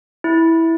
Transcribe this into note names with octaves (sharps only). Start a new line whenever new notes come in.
E4